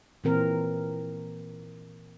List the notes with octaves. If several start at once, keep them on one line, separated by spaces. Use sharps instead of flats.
A#2 E3 C4 A#4